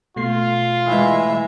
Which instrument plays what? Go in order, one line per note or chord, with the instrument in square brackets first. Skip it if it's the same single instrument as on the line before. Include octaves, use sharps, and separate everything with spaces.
[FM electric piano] B2 A3 C7 [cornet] F4
[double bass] E3 G#3 [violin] E4 E5